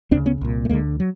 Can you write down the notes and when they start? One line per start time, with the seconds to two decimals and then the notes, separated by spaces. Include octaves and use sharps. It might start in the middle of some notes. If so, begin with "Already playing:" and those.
0.11 D2 C4 D4
0.14 C#3
0.26 B3 C#4
0.41 C2 A#2
0.65 A3
0.69 D2 D3 G#3 A#3
1.00 F#3